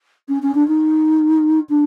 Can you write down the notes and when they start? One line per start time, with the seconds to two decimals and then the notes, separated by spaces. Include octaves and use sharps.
0.28 C#4
0.42 C#4
0.54 D4
0.67 D#4
1.69 D4